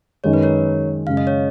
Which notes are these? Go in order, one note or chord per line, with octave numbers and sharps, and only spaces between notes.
F#2 D#3 G#3 C#5
B4
A#4 C#5
F#2 C#3 G#3 F5
D#5
C#5